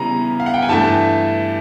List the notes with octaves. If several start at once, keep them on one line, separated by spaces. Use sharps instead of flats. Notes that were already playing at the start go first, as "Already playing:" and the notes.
Already playing: C#3 E3 G3 B3 A#5
F5
F#5
G5
G#5
G2 E3 A3 A5